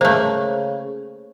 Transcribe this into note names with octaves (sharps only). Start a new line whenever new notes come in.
C#3 A3 A#3 C5